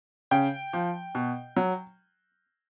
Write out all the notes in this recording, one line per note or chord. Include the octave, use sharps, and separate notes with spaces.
C#3 G5
F3
B2
F#3